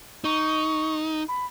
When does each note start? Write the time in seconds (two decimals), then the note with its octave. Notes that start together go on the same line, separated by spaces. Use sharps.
0.24 D#4 C#6
1.28 B5